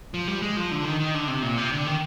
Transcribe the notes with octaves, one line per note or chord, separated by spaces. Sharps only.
F3
G3
G#3
F3
D3
D#3
D#3
D3
C3
A#2
C3
D3
D#3